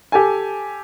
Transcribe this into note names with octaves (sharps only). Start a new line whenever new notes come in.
G4 A4 G#5